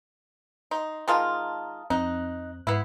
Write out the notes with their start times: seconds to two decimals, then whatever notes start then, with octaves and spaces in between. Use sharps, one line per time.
0.71 D#4 D#5 C6
1.08 D#3 G#3 F4 A5 A#5 D#6
1.90 F2 C4 D#4 F#6
2.67 G#2 B3 E4 C7